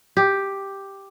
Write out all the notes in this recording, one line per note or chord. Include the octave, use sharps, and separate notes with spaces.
G4